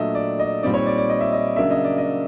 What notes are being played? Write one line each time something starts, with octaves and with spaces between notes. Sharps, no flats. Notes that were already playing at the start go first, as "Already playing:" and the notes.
Already playing: A#2 F#3 A3 D4 D#5 E5
D5
D#5
A#2 G3 C4 D#4 D5
C#5
D5
D5
D#5
E5
D#5
C#3 F#3 A#3 D4 E5
D#5
D5
D#5